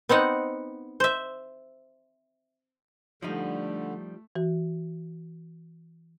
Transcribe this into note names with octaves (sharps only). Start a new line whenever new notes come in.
B3 C4 D#4 F#5
C5 E5
D3 F3 G3 A3 D#4
E3 F#4